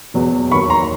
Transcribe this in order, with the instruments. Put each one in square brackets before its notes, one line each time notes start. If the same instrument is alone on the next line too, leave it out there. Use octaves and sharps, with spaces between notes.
[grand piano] E2 B2 F#3
D#2 D#3 F#3 B5 C#6
A#5 C6